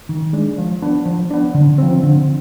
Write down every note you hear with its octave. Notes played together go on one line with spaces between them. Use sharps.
D#3
G#3 D4
F3
B3 D4
F3
B3 D4
D3
F3 C4
D3